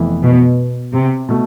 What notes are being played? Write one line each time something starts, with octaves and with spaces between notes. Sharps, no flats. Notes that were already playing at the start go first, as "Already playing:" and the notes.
Already playing: F1 F2 E3 B3 E4
B2
C3
B2 A3